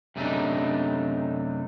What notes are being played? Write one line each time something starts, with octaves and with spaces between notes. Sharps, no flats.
F#2 C3 A3 A#3 D4 D#4